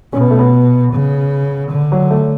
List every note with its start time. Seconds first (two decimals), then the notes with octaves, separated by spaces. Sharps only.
0.12 B2 C#4
0.21 B3
0.31 A3
0.39 B3
0.92 C#3
1.71 D3
1.92 F#3
2.10 A3